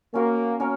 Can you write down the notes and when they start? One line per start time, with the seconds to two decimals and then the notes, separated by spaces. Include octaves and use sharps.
0.14 A#3 C#4 F#4 A#4 C#5
0.60 C#4 F#4 A#4 C#5